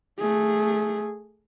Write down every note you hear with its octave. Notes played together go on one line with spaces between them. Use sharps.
A3 G#4